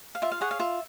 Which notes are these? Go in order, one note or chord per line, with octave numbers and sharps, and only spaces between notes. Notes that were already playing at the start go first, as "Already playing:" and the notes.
F5
F4 E5
F5
G#4 C#5 F#5
F5
F4 E5